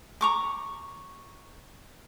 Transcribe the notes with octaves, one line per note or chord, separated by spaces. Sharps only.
A#5 C#6 D6